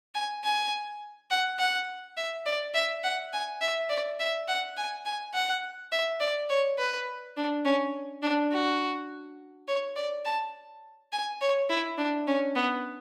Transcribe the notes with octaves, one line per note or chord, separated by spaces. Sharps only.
G#5
G#5
F#5
F#5
E5
D5
E5
F#5
G#5
E5
D5
E5
F#5
G#5
G#5
F#5
E5
D5
C#5
B4
D4
C#4
D4
F#4
C#5
D5
A5
G#5
C#5
E4
D4
C#4
B3